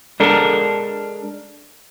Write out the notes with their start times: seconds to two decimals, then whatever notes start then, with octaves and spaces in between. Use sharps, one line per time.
0.20 G#3 D4 A4 A#4